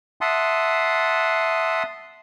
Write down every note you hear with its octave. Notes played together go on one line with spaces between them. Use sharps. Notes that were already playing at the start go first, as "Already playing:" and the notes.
E5 F#5 A5 C6 D#6